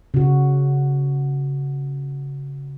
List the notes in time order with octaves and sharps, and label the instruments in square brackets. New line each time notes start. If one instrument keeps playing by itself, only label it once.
[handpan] C#3 F#4